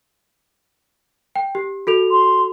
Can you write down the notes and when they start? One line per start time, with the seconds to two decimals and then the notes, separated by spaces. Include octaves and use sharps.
1.36 G5
1.55 G4
1.87 F#4 A4 F7
2.11 C6